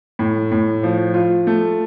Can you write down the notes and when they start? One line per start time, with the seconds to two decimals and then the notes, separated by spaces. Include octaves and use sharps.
0.19 A2
0.52 A2
0.83 F3
1.14 F4
1.47 A3